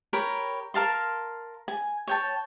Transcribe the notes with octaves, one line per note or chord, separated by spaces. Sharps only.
G4 A#4 C#5 B5
A#4 F5 A5 C6
G#5
C#5 G5 A5